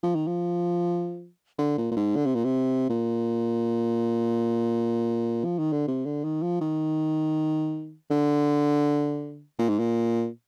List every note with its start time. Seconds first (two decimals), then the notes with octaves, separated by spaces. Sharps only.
0.03 F3
0.15 D#3
0.27 F3
1.59 D3
1.78 A#2
1.92 A#2
1.96 G#2
2.16 D3
2.26 C3
2.35 A#2
2.44 C3
2.90 A#2
5.45 F3
5.59 D#3
5.72 D3
5.88 C3
6.05 D3
6.24 D#3
6.42 F3
6.61 D#3
8.11 D3
9.59 A#2
9.69 G#2
9.79 A#2